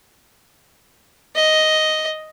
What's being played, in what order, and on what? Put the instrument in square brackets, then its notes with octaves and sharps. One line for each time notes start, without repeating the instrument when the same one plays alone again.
[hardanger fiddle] D#5